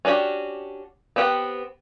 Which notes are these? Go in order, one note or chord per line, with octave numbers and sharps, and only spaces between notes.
C#4 D4 F#4 G4
B3 C4 G4 F#5